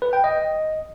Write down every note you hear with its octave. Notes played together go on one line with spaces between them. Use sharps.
B4
G5
D#5